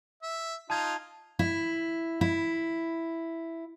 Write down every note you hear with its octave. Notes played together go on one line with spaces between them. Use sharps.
E5
D#4 F4 A5 G#6
E4
E4